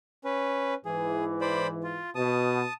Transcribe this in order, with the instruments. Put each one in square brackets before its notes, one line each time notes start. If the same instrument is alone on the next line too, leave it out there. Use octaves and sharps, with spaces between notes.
[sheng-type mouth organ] C#4 B4
[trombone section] G#2 E3 [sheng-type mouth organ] G#4
[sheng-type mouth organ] C5 D5 B5
F4
[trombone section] B2 [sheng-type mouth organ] A5 D#6